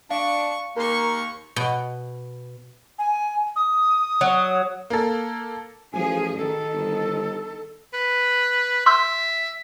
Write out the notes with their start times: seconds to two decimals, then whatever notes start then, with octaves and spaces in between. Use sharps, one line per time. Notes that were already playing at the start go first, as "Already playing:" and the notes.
0.11 D4 F5 C#6
0.77 D#2 A#3 A#4 C6 C#6
1.56 B2
2.99 G#5
3.56 D#6
4.21 F#3
4.90 A#3 A4
5.93 A1 F3 G#4 G#5
6.37 D#3 A4
6.74 G1
7.94 B4
8.86 E5 C6 E6 G6